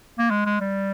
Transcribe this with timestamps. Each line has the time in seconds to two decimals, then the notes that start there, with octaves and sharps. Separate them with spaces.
0.19 A#3
0.30 G#3
0.46 G#3
0.61 G3